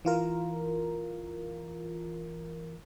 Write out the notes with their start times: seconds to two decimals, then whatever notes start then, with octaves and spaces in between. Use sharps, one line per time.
0.05 E3 F4 A#4